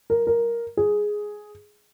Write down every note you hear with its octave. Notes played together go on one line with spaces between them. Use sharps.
A#4
A#4
G#4